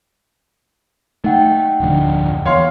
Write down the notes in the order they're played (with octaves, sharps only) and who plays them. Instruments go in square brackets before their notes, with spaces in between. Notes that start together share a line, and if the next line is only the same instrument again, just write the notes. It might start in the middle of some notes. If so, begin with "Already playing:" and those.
[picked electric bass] A3 [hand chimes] D#4 F#5 G5
[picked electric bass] D1 F2 D3
[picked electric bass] E2 [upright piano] C#5 F5 C6